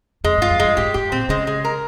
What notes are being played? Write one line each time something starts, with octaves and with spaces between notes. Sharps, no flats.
F2 G#3
G2 F4
F2
G2 G#3
G#2 G4
G#2 G4
A#2 C4
C#3 G#3
G#3
A#4